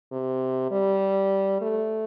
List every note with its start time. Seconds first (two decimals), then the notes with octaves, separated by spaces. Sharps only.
0.12 C3
0.71 G3
1.62 A3